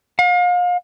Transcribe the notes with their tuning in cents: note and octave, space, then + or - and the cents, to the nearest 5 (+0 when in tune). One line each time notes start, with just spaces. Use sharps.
F5 +35